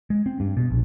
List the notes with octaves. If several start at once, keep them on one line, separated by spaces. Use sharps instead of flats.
G#3
C4
G2
B2
A#1